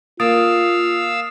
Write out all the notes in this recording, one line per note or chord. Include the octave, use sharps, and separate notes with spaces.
A#3 F4 F5 D#6 E6 A6 D7